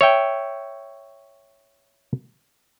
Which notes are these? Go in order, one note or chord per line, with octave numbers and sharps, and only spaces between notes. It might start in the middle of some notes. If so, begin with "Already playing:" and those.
C#5 E5 G5